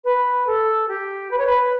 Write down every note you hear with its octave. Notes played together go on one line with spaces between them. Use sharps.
B4
A4
G4
B4
C#5
B4